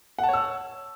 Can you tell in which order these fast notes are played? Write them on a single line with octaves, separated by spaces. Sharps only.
F#5 A5 C#5 E6